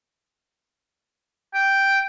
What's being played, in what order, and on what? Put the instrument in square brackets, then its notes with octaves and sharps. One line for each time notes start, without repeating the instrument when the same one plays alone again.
[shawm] G5